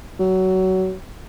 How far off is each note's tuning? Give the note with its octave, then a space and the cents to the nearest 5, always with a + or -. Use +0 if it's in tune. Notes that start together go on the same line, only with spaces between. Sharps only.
F#3 +20